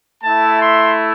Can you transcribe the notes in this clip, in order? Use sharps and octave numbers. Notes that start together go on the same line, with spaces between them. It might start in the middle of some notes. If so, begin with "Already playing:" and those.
A3 E4 A5
C6